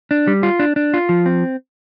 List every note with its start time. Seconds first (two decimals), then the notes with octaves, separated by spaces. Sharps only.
0.11 D4
0.27 G3
0.43 F4
0.59 D4
0.76 D4
0.94 F4
1.09 F3
1.26 C4